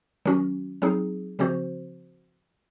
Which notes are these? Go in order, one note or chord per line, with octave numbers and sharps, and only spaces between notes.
D#3 F#3 C#4 F#4
F#3 C4 D#4 G#4
C#3 F3 C4 F#4 C5